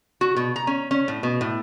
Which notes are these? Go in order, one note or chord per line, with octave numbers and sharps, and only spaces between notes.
F#4
B2
A#5
C#4
C#4
A2
B2
A2